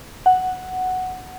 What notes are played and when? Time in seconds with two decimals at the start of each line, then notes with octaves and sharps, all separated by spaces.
0.26 F#5